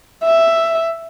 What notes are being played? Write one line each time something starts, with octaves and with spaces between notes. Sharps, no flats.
E5